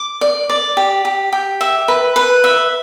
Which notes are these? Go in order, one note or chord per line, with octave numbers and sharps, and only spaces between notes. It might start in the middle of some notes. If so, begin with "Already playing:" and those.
Already playing: D6
D5
D5
G4
G4
G4
E5
B4
B4
E5